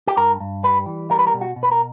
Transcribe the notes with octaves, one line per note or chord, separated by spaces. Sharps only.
G4
G2 A#4
G2
G3 B4
E3
G3 A#4
B4
A#4
B2
F#4
B2
B4
A#4